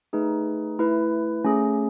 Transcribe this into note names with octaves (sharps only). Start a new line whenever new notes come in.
A3 D#4 G#4 B4
A3 E4 B4
A3 C#4 G#4